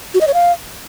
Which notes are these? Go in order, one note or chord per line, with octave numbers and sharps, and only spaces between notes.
F#4
D#5
C#5
F5